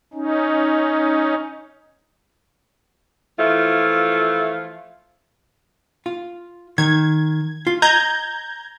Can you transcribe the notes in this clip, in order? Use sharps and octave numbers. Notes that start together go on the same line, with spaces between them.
C#4 D#4
E3 F3 A3 E4 F4
F4
D#3 G#6
F4
D#5 A#5 G6 G#6